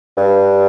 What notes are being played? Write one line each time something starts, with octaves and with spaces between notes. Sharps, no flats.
G2